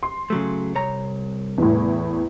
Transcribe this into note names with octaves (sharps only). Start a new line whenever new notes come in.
C6
C#3 F#3 A3
C2 C#5 A#5
E2 A2